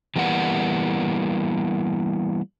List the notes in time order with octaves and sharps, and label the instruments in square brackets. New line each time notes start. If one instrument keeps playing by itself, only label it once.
[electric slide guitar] E3 G3 A#3 B3 F#5